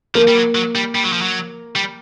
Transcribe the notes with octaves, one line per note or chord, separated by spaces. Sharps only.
F3 A#3
G3
F#3
F#3
G3
G3
F#3
F3
F#3
G3